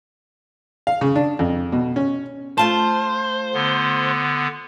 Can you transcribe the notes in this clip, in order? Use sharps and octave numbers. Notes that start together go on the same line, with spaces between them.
F5
C#3
D4
F2
B2
C#4
A3 F4 C5 A5
D3 B3